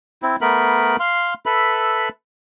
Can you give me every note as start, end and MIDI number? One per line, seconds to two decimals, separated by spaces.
0.22 0.36 60
0.22 0.36 64
0.41 0.96 57
0.41 0.96 59
0.41 0.96 70
0.41 0.96 83
0.99 1.34 77
0.99 1.34 84
1.46 2.09 69
1.46 2.09 71
1.46 2.09 76
1.46 2.09 83